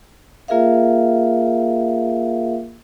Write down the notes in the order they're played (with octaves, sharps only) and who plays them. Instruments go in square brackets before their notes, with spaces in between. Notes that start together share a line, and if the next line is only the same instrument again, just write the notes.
[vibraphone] A#3 F4 G#4 A#4 E5 F5